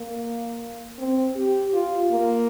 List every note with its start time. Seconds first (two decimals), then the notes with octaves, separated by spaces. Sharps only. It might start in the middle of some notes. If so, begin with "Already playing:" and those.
Already playing: A#3
0.99 C4
1.36 G4
1.73 F4
2.12 A#3